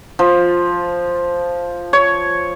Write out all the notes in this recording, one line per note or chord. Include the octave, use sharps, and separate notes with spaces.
F3
C#5